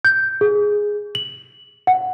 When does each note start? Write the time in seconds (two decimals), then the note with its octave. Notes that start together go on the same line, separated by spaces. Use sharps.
0.05 G6
0.41 G#4
1.15 F#7
1.87 F#5